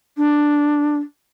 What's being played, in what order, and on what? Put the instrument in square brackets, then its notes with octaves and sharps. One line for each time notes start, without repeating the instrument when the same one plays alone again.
[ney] D4